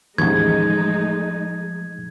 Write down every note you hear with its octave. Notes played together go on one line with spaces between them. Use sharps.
A1 D#2 F3 G#3 A3 D#4 G#6